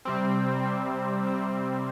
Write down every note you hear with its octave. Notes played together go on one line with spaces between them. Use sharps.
C3 G3 C4
C3 G3 C4
C3 G3 C4